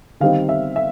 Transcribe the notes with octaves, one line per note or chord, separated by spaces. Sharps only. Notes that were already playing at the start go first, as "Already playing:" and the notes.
D#3 G3 C4 D#4 F5
E5
E5